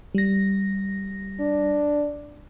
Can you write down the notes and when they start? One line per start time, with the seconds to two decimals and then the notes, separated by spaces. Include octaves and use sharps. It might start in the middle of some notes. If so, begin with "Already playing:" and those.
0.15 G3 A#6
1.40 D4